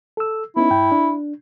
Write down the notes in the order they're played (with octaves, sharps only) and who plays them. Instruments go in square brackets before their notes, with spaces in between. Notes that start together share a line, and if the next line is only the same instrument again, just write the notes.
[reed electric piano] A4 E6
[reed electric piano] B3 C#4 D#4 [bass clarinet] E4
[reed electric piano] G2 G5
D4